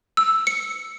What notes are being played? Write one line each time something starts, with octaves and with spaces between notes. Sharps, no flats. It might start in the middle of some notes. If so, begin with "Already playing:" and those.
E6
C#7